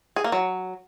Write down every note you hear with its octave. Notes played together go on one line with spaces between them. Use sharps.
G#4
A#3
F#3